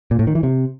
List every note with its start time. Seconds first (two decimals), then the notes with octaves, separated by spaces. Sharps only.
0.11 A#2
0.19 A2
0.27 D#3
0.35 E3
0.43 C3